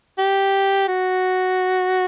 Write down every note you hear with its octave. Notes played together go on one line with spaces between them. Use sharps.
G4
F#4